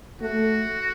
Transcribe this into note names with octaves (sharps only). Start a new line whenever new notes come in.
A3 F#4